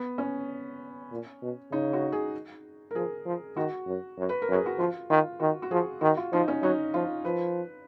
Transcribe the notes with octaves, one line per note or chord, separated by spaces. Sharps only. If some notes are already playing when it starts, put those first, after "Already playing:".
Already playing: B3
C#4
A#2
B2
C#3 D#4
F#4
G#4
A#4
F3 G#4
F3
D#3 F#4
F#2
F#2
B4
A#4
F#2
G#4
F#4
F3 F4
D#3 F4
D#3 F#4
F#4
F3 G#4
D#3 F#4
F4
F3 D#4
C#4
F#3 D#4
F3 F4
F3 B4